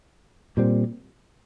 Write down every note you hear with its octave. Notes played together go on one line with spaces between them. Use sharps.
A#2 G3 C4